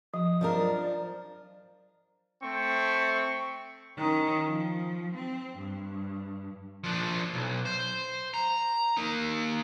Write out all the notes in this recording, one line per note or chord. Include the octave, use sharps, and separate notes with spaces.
F3 D#6
F3 F#3 D4 A#4 D5
A3 C4 C#6
D#3 C#4
F3
C4
G2
F3 D4
B1
C5
A#5
A#3 D#4